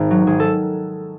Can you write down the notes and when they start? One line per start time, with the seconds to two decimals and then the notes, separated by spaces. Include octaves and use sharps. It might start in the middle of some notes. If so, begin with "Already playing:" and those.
Already playing: G#1
0.11 F#3
0.27 G#1 G#4
0.40 A4